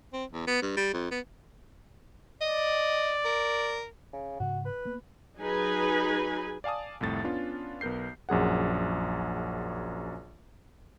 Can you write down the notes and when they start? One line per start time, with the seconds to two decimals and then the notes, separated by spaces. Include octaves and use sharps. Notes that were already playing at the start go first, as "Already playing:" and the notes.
0.13 C4
0.32 E2
0.47 B3
0.62 G2
0.76 G3
0.94 F2
1.11 B3
2.41 D5 D#5
3.25 A#4
4.13 C#3
4.40 G#2 C#3 F#4
4.65 B4
4.85 A#3 B3
5.40 F#3 D#4 G#4 B4 G#5
6.64 D5 F5 G#5 A5 D#6
7.01 C2 F2 A2 A6
7.24 B3 C#4 D4 F4
7.81 B1 B3 A#4 G6 C7
8.29 A#1 F#2 G#4 F#5